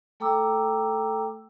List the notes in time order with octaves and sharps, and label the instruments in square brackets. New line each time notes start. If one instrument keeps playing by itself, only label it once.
[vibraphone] A3 A4 G5 A#5 D6 E6